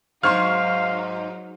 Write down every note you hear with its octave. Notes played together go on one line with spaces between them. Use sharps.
G#2 F#3 D#4 F5 C6 C#6 F6